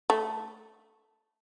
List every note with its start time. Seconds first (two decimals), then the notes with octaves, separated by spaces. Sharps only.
0.10 A3